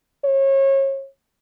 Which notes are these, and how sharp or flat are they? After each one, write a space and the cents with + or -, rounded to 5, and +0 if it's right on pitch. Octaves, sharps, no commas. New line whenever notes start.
C#5 -30